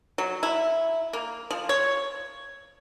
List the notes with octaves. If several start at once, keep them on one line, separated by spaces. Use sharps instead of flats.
F#3
E4
A#3
F3
C#5